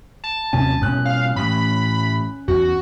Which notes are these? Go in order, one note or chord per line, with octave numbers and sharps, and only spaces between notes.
A5
D#2 C3 C#4 G#5
G#2 B2 C#4 F#6
F5
A2 E3 B5
E2 F#4